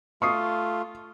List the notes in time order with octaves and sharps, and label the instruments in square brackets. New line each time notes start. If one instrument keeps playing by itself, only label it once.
[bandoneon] A3 F4 [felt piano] C#6 D#6 C7